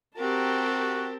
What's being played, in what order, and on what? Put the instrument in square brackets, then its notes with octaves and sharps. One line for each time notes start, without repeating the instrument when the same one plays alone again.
[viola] C4 A5 [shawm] F#4 [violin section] G4 A#4